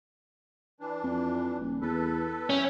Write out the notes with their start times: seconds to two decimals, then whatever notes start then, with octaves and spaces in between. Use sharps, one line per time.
0.80 E3 D4
1.03 F2
1.60 D#1
1.82 E2 A4 B4
2.50 F#2 C#4 E5 G5